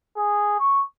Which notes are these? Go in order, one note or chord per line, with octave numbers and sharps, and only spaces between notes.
G#4
C#6